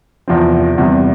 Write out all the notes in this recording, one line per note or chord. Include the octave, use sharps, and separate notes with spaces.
E2 C3 F3 C4
E2 C3 G3